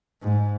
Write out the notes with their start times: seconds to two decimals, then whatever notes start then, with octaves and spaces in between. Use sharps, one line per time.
0.22 G#2